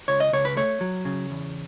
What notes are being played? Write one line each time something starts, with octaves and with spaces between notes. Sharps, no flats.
C#2 C#5
D#5
C#2 C#5
B4
A3 C#5
F#3
C#3
E2